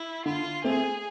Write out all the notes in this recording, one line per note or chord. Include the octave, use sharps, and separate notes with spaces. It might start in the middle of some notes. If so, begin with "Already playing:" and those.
Already playing: E4
D3 F4
A3 C4 G#4